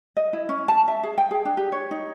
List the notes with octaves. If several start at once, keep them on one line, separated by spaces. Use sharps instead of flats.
D#5
E4
C#4
A5
E5
G#4
G5
G#4
D4
G4
C#5
D#4